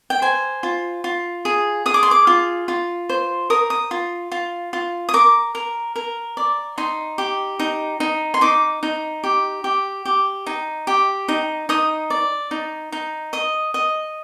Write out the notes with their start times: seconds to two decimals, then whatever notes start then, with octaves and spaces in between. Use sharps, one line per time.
0.10 G5
0.22 C5 G#5
0.63 F4
1.04 F4
1.45 G#4
1.86 G#4 D#6
1.94 D6
2.03 C6
2.11 D6
2.27 F4
2.68 F4
3.09 C5
3.50 A#4 D#6
3.70 D#6
3.91 F4
4.32 F4
4.73 F4
5.09 D#6
5.14 A#4 D6
5.55 A#4
5.96 A#4
6.37 D5
6.78 D#4 C6
7.18 G4
7.59 D#4
8.00 D#4
8.34 C6
8.41 D#4 D6
8.83 D#4
9.24 G4
9.64 G4
10.05 G4
10.47 D#4
10.87 G4
11.28 D#4
11.69 D#4 D#6
12.10 D5
12.51 D#4
12.92 D#4
13.33 D#5 D#6
13.74 D#5